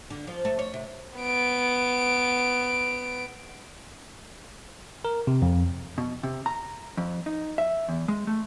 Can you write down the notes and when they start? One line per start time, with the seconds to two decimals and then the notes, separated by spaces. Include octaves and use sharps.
0.10 D3
0.27 F3
0.45 A3
0.59 C#5
0.73 C3
1.18 B3 D7
5.05 A#4
5.27 C3
5.42 F2
5.98 B2
6.23 C3
6.46 A#5
6.97 F2
7.26 D#4
7.58 E5
7.89 E2
8.08 G#3
8.27 A3